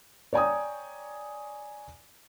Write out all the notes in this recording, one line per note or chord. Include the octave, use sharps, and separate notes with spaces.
C#5 D5 G5 G#5 A#5 D#6